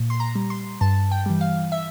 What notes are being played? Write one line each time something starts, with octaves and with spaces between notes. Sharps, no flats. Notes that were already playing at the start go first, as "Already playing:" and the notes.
Already playing: A#2
C6
A#5
G3
C6
G2 A5
G5
E3 G3
F5
E5